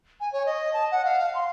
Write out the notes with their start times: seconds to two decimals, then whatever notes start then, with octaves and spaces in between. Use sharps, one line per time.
0.20 G#5
0.32 C#5
0.46 D#5
0.73 A5
0.91 F#5
1.05 F5
1.19 F5
1.35 C6